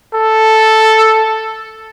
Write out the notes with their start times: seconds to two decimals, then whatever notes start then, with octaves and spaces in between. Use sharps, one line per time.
0.14 A4